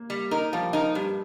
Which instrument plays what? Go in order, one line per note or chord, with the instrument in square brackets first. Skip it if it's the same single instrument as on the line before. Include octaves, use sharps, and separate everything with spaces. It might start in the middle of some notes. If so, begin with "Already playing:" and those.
Already playing: [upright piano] A#3
[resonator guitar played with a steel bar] G3
D#4 A#4
[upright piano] F3 [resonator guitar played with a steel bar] G3
[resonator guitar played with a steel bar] D#4 A#4
[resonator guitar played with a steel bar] G2 [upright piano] G3